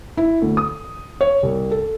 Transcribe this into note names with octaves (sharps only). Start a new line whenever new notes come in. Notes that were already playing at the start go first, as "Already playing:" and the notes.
E4
D2
D#6
C#5
C2
A4